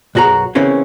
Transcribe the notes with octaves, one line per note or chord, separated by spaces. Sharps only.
B1 F#2 F#4 G#4 A#5
C#3 E3 A#3 C4 C#4